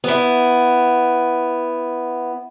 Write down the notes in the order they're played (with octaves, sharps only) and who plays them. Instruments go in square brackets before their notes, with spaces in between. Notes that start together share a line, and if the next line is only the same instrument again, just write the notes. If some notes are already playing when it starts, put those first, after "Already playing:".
[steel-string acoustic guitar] B3 E4